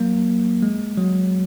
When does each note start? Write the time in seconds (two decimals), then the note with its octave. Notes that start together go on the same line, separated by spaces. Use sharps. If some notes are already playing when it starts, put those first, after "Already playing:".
Already playing: F#3 A#3
0.63 G#3
0.98 F#3